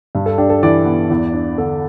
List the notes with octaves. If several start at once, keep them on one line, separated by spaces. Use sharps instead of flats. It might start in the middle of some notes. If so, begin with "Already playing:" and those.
G2
A4
D4 G4
A4
E3 D5
B3
E2
D4
D3 A4